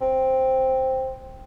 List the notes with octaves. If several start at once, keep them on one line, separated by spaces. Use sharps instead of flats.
C4